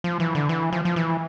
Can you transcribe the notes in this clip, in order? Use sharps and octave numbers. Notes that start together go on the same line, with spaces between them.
F3
E3
D3
E3
F3
F3
E3